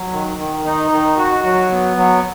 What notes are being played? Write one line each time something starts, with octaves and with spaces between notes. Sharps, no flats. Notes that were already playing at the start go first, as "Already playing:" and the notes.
Already playing: F#3
D#3
D#3
D#4
D#3
F#4
F#3
B3
F#3